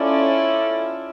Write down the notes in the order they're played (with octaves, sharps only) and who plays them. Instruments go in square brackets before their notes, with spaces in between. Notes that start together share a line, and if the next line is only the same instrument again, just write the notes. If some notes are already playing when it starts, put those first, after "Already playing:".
Already playing: [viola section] C#4 F4 A4 D5 [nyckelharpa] E4